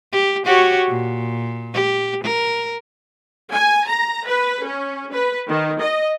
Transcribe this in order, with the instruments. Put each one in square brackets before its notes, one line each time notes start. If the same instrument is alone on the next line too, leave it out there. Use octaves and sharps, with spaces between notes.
[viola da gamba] G4
F#4 G4 C#5
A#2
G4
A#4
[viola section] G#5
A#5
B4
C#4
B4
D#3
D#5